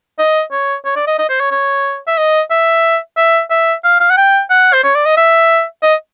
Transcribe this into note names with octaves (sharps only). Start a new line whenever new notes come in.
D#5
C#5
C#5
D5
D#5
D#5
C5
C#5
C#5
E5
D#5
E5
E5
E5
F5
F5
F#5
G5
F#5
C5
C#5
D5
D#5
E5
D#5